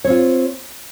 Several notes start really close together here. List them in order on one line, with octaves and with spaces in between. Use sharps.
C#5 C4 F4